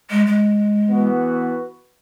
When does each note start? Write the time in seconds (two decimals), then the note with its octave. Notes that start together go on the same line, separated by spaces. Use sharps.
0.10 G#3
0.27 G#3
0.89 E3 B3 F#4 B4